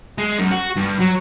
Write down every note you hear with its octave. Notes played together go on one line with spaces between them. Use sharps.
G#3
F#2
F#4
G2
F#3